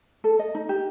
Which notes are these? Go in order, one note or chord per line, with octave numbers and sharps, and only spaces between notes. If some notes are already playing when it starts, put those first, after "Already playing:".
A4
D#5
D#4
G4